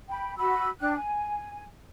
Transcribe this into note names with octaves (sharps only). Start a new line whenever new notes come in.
G5 B5
F#4 B5 E6
D4 G5 F#6
G#5